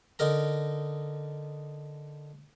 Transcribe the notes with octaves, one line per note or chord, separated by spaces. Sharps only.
D3 D#4 A#4 A#5